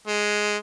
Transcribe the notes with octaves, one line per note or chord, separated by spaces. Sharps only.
G#3